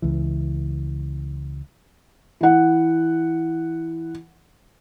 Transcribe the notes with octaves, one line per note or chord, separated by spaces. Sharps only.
C#2 E3
E3 F#5